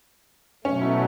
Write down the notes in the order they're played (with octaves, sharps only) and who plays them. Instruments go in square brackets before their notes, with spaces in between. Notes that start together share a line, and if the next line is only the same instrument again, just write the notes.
[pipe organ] B2 F#3 A3 [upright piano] C#4
[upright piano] E4